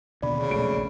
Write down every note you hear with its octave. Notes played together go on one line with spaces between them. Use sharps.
D#2 B2 D3 D5 B5
C#3
E1 A#1 A3 D7